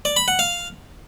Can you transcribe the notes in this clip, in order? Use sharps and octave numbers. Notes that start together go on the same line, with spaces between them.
D5
B5
F#5
F5